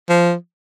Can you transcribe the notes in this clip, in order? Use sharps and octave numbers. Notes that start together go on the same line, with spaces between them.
F3